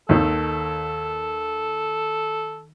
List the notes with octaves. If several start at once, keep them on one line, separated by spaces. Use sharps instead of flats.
D#2 D#3 A4